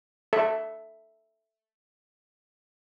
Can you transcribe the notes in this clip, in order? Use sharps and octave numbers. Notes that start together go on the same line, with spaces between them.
A4 E5